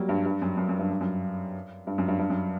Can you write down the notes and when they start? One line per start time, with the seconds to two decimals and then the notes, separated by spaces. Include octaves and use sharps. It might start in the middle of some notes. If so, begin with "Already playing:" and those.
Already playing: F#3 G3 A#3
0.09 G2
0.26 G2
0.42 F#2
0.57 F#2
0.69 F#2
0.79 G2
0.90 G2
1.01 F#2
1.87 G2
1.98 F#2
2.08 G2
2.19 G2
2.30 F#2